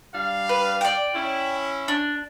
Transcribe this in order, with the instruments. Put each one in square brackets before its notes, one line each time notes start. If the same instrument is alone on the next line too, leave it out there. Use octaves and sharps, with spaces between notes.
[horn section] G3 D4 F5
[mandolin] B4
D5 G5
[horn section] C#4 E4
[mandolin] D4